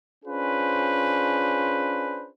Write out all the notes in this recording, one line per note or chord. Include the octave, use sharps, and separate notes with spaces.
C#4 D4 F4 G#4 B4 C5